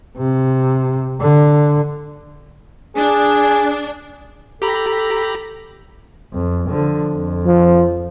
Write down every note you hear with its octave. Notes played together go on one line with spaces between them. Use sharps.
C3
D3
D4 G#4
G4 A4 A#5 B5
F2
D3 F3
F2
F3